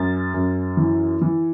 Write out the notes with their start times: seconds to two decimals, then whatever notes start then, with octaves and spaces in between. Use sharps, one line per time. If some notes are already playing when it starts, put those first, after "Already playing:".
Already playing: F#2 A6
0.34 F#2
0.77 E3
1.22 E3